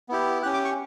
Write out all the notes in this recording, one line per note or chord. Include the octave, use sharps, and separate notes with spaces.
B3 E4 G4
C#4 G4 F#6
D6
C#6